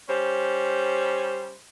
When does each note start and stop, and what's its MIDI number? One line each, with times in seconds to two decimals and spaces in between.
0.09 1.53 55
0.09 1.53 61
0.09 1.53 72